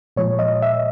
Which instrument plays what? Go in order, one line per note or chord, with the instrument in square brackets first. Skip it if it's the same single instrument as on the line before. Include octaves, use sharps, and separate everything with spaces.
[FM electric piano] A#2 F3 G#3 C#5
D#5
E5